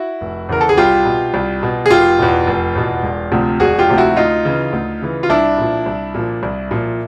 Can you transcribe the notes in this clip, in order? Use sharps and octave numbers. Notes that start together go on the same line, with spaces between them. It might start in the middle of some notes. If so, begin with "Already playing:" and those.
Already playing: E4 F#4
F1
E2 C#3 E3 A#4
A4
G#4
C2 F4 G4
B2
C2
B2
G#4
F1 F4 G4
E2 B2
F1
E2 B2
E1
D2 C3 F3
E1 F#4 G#4
F4 G4
D2 C3 F3
E4 F#4
D2 D#4 F4
C#3 E3
D2
C#3 E3
F4
C2 D4 E4
A#2 F3
C2
A#2 F3
C2
A#2 F3